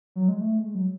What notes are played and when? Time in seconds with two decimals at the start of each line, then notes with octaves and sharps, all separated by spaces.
0.16 F#3
0.28 G#3
0.41 A3
0.59 G#3
0.75 F#3